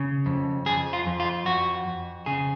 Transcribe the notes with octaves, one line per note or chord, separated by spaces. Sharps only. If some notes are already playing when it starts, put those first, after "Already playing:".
Already playing: C#3
F2
F2 G#4
F4
F2
F4
F2 F#4
F2
C#3 G#4